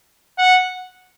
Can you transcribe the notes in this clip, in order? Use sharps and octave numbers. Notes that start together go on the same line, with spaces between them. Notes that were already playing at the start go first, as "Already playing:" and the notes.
F#5